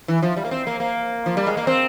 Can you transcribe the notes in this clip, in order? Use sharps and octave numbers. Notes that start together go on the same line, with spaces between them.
E3
F3
G3
A#3
C4
A#3
A#3
F3
G3
G#3
A#3
C4